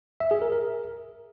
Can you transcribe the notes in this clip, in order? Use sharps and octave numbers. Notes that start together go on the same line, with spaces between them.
E5
G#4
A#4
A#4